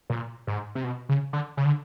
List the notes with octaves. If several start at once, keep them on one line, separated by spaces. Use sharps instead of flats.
A#2
G#2
C3
B2
C#3
D3
C#3
D3